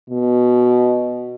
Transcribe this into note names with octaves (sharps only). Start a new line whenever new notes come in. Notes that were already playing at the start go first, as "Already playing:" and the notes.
B2